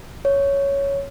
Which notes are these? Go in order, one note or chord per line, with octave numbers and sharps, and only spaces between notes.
C#5